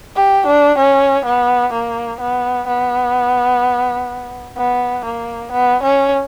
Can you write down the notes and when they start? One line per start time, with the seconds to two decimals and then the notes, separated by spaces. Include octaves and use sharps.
0.16 G4
0.47 D4
0.78 C#4
1.26 B3
1.73 A#3
2.21 B3
2.68 B3
4.57 B3
5.05 A#3
5.52 B3
5.83 C#4